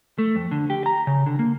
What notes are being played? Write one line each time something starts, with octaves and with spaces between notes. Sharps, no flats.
A3
F2
D3
G4
A#5
C#3
D3
A#3